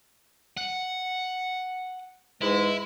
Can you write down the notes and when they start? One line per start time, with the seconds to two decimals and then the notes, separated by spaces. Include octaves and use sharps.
0.57 F#5
2.42 G#2 E3 G#3 E4